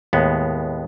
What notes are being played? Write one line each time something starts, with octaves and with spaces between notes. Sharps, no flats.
D#2 A2 G#3 B3